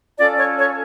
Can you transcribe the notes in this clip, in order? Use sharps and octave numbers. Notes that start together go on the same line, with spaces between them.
C#4 F4 A4 D5
C#5
C#5